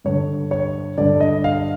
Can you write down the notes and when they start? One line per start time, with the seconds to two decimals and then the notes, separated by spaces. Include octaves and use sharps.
0.04 G2 D3 C#5
0.51 C#5
0.98 G2 D3 D5
1.20 D#5
1.44 F5